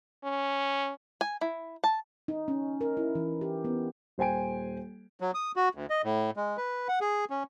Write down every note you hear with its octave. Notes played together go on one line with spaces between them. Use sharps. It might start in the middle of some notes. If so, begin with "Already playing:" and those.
C#4
G#5
E4
A5
D#4
C#4
A#4
E4
E3
G4
B3
D#1 C5 G5 G#5 D7
F#3
D#6
F#4
D2
D#5
A2
G#3
B4
F#5
G#4
C#4